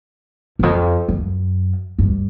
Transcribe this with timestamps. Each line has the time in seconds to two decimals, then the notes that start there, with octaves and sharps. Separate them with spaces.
0.59 E2
0.63 F2
1.08 F#2
1.99 G2